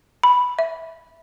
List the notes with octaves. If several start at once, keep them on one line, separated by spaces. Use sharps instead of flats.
B5
E5